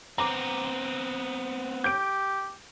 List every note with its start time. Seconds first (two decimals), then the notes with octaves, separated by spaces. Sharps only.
0.18 B3 C4 A#5 D6
1.84 G4 G6 D7